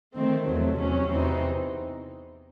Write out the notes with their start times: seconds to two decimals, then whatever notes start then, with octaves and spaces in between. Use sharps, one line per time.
0.15 D#3 A3 C4
0.47 E2 C3 F#3 A3
0.78 E2 C3 F#3 C#4
1.10 E2 C3 E3 C4 D#4